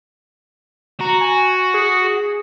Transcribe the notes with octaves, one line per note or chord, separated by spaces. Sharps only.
F#4 A#5
G#5
G#4